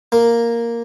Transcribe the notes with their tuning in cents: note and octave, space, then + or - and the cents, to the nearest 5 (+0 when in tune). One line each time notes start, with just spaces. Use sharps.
A#3 +0 A#4 +0